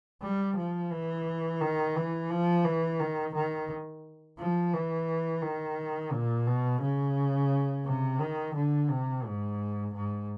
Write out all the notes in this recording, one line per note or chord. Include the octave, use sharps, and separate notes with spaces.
G3
F3
E3
D#3
E3
F3
E3
D#3
D#3
F3
E3
D#3
A#2
B2
C#3
C3
D#3
D3
C3
G#2
G#2